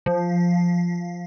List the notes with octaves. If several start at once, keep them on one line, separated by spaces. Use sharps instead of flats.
F3